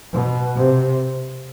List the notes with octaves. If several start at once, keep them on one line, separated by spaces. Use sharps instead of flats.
B2
C3